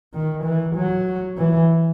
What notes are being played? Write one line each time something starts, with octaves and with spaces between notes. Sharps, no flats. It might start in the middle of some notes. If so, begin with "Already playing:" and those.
D#3
E3
F#3
E3